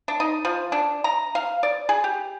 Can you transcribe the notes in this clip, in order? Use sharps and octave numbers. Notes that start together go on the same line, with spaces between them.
D4
D#4
F3
D4
A#5
F5
D5
G#4
G4